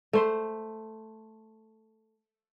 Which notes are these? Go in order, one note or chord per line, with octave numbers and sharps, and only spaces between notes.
A3 C5